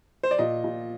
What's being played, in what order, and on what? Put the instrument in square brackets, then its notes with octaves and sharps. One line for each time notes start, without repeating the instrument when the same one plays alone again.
[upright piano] C5
D5
A#2 D#5
A#2